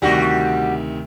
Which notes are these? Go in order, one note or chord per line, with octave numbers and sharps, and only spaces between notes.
D2 C3 D#3 G3 F#4